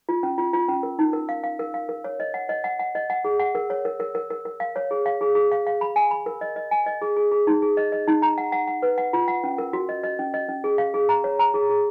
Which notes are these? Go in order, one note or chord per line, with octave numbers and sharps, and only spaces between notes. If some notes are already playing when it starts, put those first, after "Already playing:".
F4
C#4
F4
F4
C#4
A#4
D#4
A#4
F5
F5
A#4
F5
A#4
C#5
D#5
F#5
D#5
F#5
F#5
D#5
F#5
G#4
F#5
A#4
C#5
A#4
A#4
A#4
A#4
A#4
F5
C#5
G#4
F5
G#4
G#4
F5
F5
B5
G#5
B5
A#4
D#5
D#5
G#5
D#5
G#4
G#4
G#4
D#4
G#4
D#5
D#5
D#4
A#5
F#5
F#5
F#5
B4
F#5
F4
F#5
C#4
A#4
F#4
D#5
D#5
C#4
D#5
C#4
G#4
F5
G#4
A#5
C#5
A#5
G#4
G#4